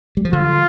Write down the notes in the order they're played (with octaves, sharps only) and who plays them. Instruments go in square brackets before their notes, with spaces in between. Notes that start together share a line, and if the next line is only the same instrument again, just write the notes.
[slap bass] G3
F3
[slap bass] D3 [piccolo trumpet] F4